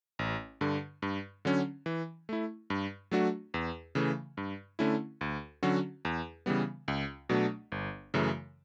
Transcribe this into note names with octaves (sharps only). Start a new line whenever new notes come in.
A1
G2 D3
G2
D3 F#3 C#4
E3
A3 E4
G2
F#3 A3 D4 F#4
E2
C#3 E3 A3
G2
D3 A3 C#4 E4
D2
D3 F#3 C#4 F#4
E2
C#3 E3 G3 B3
C#2
B2 F#3 A3 D4
G1
F#2 C#3 E3 A3